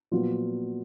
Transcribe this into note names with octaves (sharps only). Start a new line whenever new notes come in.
A#2 F3 F#3 B3 F4